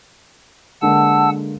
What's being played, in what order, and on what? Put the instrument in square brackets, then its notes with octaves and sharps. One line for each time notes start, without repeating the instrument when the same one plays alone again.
[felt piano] D3 G#3 A#3 [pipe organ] F#5 A5 E6